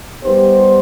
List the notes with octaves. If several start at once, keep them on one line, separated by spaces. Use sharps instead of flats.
G3 B3 D#4 G4 C5